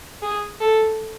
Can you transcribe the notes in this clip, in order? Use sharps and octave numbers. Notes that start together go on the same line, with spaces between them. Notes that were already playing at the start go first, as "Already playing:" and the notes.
G#4
A4